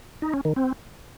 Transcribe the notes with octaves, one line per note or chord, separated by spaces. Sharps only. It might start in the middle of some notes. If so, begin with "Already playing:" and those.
D#4
C#4
D#3
C4